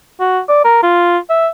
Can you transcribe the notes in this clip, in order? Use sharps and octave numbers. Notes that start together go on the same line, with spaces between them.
F#4
D5
A#4
F4
E5